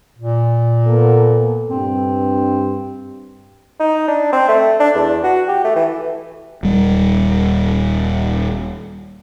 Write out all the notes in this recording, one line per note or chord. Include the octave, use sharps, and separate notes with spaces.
A#2
A#3 B3 A4
G2 C4
D#4
D4
C4
A3
D4
E2
F#4
G4
A3
E3
D#1 G3